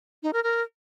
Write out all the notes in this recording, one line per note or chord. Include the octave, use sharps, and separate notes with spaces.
D#4
A#4
A#4